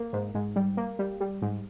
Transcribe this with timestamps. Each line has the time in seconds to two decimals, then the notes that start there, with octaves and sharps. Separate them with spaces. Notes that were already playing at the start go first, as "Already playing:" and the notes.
Already playing: A#3
0.13 G#2
0.35 G#2
0.56 G3
0.77 A#3
0.99 G3
1.20 G3
1.42 G#2